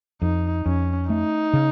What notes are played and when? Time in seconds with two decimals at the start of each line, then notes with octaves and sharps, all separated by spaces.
0.22 F2 D#4
0.66 F2 C#4
1.10 A3 D#4
1.53 C#3